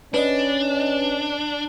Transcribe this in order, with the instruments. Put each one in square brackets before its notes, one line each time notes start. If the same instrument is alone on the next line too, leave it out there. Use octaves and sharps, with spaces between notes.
[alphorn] C#4 [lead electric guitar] D4 [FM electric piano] B4 D5 D#5